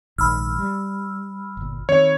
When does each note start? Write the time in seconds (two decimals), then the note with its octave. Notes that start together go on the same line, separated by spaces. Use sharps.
0.18 A#1 G#2 D#3 B5 E6 F6
0.59 G3
1.57 G1 A#2
1.89 D#3 C4 C#5